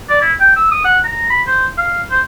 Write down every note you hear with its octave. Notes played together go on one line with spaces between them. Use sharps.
D5
E4
G5
E6
D#6
F#5
A#5
B5
C5
F5
C5